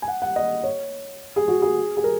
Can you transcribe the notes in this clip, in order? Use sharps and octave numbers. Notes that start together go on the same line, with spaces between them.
G#5
F#5
F#5
D#5
C#5
G#4
F#4
G#4
G#4
A#4